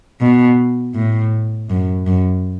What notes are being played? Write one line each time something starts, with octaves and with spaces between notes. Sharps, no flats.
B2
A2
F#2
F#2